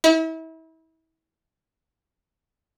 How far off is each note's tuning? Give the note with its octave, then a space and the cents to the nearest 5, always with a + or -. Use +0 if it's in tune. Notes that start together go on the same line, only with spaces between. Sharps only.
E4 -35